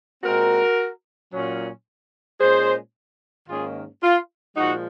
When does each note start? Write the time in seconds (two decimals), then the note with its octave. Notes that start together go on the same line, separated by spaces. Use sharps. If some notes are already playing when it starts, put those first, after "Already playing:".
0.24 A#2 G#3 C4 F#4 A#4
1.32 A#2 F#3 C#4
2.40 A#2 G#3 C#4 G#4 C5
3.48 G#2 D#3 A#3 C#4 F4 G#4
4.02 F4
4.56 A#2 F3 G#3 D#4 F#4